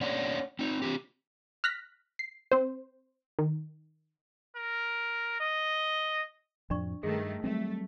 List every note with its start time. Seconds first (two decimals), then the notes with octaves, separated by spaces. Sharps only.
0.01 A#3 C#4 D4 C#5 D5 F#5
0.59 C4 D#4
0.82 C4 D4 G4
1.64 F6 F#6 A#6 B6
2.19 C7
2.52 C4 C5
3.39 D#3
4.56 A#4
5.40 D#5
6.70 F2 A2 F3 D4 D5 C#6
7.03 G2 D#3 A3 G#4
7.44 F#3 G3 A3 C4